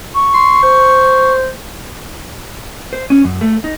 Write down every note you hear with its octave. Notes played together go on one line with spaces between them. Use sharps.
C#6
C6
C5
C5
C#4
F#2
A3
D#4